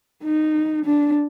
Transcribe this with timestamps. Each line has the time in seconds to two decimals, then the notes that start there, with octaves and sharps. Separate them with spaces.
0.24 D#4
0.86 D4